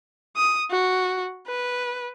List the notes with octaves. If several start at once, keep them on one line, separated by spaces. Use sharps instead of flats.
D#6
F#4
B4